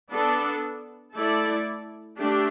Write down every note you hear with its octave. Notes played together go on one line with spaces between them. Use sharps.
B3 D4 A4
A3 E4 A4 D5
A3 D4 G4